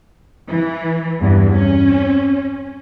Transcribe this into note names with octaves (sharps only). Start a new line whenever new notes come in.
E3
E2 G2
C#4